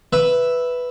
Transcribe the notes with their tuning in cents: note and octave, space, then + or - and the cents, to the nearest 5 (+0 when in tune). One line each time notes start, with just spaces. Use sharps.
B4 +0 E5 +0